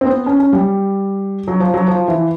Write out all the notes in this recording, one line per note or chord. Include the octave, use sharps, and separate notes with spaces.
C4
B3
C#4
C#4
G3
F#3
F3
F#3
F3
E3